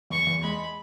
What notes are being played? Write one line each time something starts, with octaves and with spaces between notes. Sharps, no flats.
E2 C#6
E2
G#3 B5